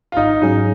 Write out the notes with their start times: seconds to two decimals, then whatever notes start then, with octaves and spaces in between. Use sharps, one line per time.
0.12 F4
0.16 G#1 D#4
0.41 G#2 F#3 C#4 D#4 G#4